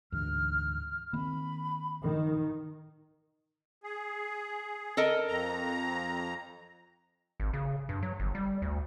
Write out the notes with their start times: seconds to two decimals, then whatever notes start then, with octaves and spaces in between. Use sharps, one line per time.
0.12 D2 G#2 E3 F6
1.13 D#3 A#3 C4 B5
2.02 D#3
3.84 G#4
4.97 A4 A#4 D#5
5.27 F2 A#5
7.40 G#1
7.53 C#3
7.89 G2
8.03 F#3
8.20 G1
8.35 G3
8.62 D2